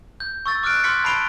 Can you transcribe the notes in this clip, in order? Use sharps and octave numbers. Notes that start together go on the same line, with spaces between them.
G6
C#6 E6 A6
D6 F6 F#6 D7
C6 D6 F6 G#6 B6 C#7
A5 B5 C7 D7 F7 G7